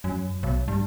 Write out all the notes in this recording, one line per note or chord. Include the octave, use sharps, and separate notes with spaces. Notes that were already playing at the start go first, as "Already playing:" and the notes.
F#2
B1
G2